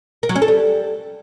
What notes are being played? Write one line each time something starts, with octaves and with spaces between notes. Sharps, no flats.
A#4
F#3
C#4
A4
G3